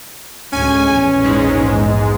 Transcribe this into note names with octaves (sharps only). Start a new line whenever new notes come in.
D2 A2 G#3 C#4 G#5
A#1 E2
G#2 G#3